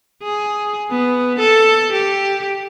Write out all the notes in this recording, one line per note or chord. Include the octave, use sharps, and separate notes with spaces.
G#4
B3
A4
G4